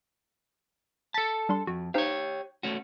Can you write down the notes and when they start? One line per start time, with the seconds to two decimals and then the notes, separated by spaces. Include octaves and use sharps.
1.14 A4 A5 B6
1.49 G3 D4 C6
1.67 F2 F#4
1.94 D#4 G4 C5 C#5 F5
2.63 A3 C#4 F#4